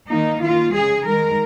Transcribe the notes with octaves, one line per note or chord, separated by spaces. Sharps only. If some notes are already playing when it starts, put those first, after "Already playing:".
D#3 A#3 D#4
D#3 A#3 F4
C#3 G#3 G#4
D#3 G#3 A#4